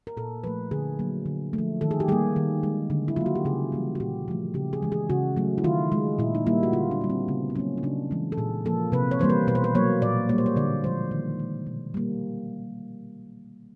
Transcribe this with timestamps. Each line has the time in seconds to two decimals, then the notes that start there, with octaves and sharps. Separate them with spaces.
0.07 A#4
0.17 A#2 A4
0.44 F3 A3 B4
0.71 D3 G#4
0.99 F#3 A#3
1.26 D3
1.53 A3
1.58 F3
1.81 D#3 A4
1.91 G#4
2.00 G4
2.08 G3 A#3 G#4
2.36 D#3
2.63 G#3
2.90 D3
3.08 E4
3.16 F#3 A#3 F4
3.26 F#4
3.36 G4
3.45 C#3 G#4
3.72 E3 G3 A#3
3.95 F#4
4.00 A#2 G4
4.28 F3 A3
4.54 C#3 G4
4.73 G#4
4.82 E3 G#3
4.92 G#4
5.10 C#3 F#4
5.36 F#3 A3
5.58 E4
5.64 D#3 F4
5.92 G#3
6.19 A#2 E4
6.35 D#4
6.47 G3 A#3 E4
6.63 F#4
6.73 D3 F4
6.91 D4
7.01 G3 A#3
7.10 C4
7.28 C#3 B3
7.50 C4
7.55 F#3 A#3 C#4
7.78 D#4
7.83 C#3 D4
8.11 E3 G#3
8.32 A4
8.38 A#2 G#4
8.65 F3 A#3 A4
8.92 C3 B4
9.11 C#5
9.19 E3 G3 A#3 C5
9.30 B4
9.47 B2 B4
9.55 C5
9.64 B4
9.75 F#3 A#3 C#5
10.02 A#2 D5
10.29 G3 A#3 C#5
10.38 C5
10.46 C#5
10.56 D3 D5
10.84 F3 G#3 C5
11.11 D#3
11.39 G#3
11.67 B2
11.94 G3 A#3